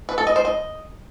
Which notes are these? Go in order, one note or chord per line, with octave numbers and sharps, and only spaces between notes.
B4
A4
D#5
C5
D#5